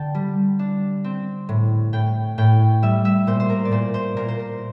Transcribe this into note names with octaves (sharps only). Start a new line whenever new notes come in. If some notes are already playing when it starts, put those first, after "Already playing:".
Already playing: D3 G5 A5
G3
D4
C4
A2
A2 G5
A2 G5
G3 E5
E5
A#2 C5
C5
A#4
D5
A#2 C5
C5
A#2 A#4
C5
A#4